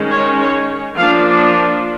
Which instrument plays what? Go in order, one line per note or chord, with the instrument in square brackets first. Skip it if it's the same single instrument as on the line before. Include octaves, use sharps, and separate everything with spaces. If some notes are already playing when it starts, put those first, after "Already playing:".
Already playing: [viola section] D#3 G#3 C#4
C#5
C#5
F3 A#3 D4 F5